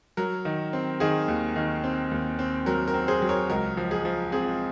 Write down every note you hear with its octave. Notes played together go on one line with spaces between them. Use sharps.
F#3 A#4
D#3
C4
D#3 G#4
D#2
D#3
C4
D#2
C4
F#3 A#4
A#4
C4
G#4 C5
F#3
A#4 C#5
C#2 A#4
F3
G#4
F3
C4 G#4